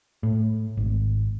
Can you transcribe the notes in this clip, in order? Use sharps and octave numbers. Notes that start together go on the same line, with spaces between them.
A2
G#1